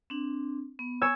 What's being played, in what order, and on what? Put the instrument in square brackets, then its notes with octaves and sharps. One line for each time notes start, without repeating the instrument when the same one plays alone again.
[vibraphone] C4 D4
B3
[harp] C#5 G#5 E6